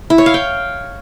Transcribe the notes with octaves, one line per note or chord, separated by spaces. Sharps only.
E4
C#5
F5
G5